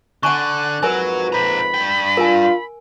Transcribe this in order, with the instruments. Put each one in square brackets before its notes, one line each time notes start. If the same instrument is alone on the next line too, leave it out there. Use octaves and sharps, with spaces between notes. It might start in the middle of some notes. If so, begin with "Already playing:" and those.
[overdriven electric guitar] D3 [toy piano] F#5 G#5 C#6 [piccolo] F#6
[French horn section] F2 G#2 B4 [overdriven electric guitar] F#3 F#4 [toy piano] A#4 G#5
[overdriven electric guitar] C5 A#5 [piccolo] B5
[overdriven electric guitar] G2 G5
[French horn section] F4 [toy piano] A#4 G#5